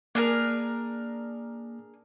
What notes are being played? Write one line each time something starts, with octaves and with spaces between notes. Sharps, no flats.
A#3 D4 G#4 A#4